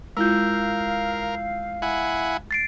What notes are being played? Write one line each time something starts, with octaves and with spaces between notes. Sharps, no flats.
G#3 E4 F4 A#4 F5 E6 G6
E4 F#5 G#5
A6 C7 D7